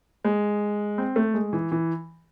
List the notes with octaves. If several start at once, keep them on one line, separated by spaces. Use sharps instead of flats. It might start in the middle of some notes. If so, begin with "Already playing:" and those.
G#3
C4
A3
G#3
E3
E3